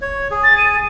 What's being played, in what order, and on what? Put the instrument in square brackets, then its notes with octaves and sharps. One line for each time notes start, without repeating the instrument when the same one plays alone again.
[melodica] C#5
G#4
[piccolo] A6
D#7